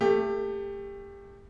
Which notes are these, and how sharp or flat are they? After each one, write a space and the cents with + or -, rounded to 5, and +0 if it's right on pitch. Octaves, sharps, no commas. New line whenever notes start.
A3 +20 G4 +25